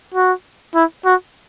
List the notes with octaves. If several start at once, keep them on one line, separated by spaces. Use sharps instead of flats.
F#4
E4
F#4